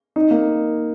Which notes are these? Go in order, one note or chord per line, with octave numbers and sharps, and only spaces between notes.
D#4
A#3